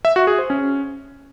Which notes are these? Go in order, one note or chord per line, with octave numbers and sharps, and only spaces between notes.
E5
F#4
G#4
C5
C#4